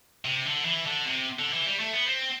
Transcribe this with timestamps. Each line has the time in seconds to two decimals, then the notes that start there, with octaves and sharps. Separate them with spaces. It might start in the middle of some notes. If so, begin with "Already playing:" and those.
0.25 C3
0.45 D3
0.65 E3
0.86 D3
1.05 C3
1.39 D3
1.53 E3
1.66 G3
1.79 A3
1.93 B3
2.06 C4